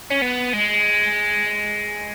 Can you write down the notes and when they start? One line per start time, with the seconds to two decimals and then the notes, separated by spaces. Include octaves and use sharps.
0.10 C#4
0.22 B3
0.53 G#3